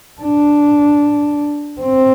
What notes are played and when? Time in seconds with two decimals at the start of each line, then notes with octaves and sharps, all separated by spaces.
0.21 D4
1.82 C4